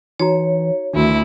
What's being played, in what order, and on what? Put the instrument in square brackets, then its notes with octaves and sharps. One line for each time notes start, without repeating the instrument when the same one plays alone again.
[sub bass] E3 [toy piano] D#4 F#4 A#5 [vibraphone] C#5
[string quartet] D2 E4 [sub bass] D#3 [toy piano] D4 F#4